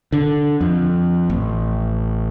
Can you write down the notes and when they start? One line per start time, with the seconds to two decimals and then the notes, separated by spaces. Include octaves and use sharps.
0.12 D3
0.61 F2
1.30 A1